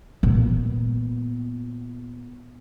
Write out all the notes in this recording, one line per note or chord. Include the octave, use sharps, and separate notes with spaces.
A#2 B3